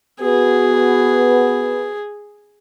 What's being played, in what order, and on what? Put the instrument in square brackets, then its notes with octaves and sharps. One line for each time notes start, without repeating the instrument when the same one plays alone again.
[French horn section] B3 F#4 B4 [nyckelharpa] G#4